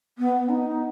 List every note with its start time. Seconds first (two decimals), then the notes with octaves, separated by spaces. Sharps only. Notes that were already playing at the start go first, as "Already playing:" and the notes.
0.18 B3
0.49 D#4